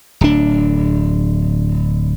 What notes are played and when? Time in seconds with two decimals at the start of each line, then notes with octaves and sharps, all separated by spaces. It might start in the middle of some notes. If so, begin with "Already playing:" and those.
0.21 D1 D4